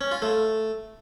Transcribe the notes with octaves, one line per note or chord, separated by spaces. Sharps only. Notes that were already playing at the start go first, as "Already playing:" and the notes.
C#4
F4
A3